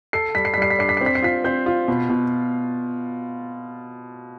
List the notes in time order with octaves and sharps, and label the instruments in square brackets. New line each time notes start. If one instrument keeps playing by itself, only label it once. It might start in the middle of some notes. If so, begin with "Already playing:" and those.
[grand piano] A4 [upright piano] C7
[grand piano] G3 [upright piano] B6
[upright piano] C7
B6
[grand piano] G3 [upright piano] C7
[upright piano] B6
[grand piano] D4 [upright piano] C7
[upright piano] B6
C7
[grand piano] C4
[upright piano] B6
C7
[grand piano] F4 [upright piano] B6
[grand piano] C4 [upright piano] G6
[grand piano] F4
B2
B2